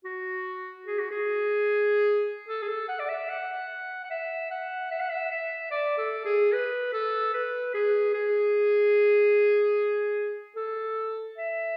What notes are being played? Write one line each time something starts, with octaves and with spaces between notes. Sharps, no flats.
F#4
G#4
F#4
G#4
A4
G#4
A4
F#5
D5
E5
F#5
F#5
E5
F#5
E5
F#5
E5
E5
D5
A4
G#4
B4
A4
B4
G#4
G#4
A4
E5